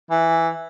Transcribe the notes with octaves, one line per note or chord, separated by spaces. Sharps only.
E3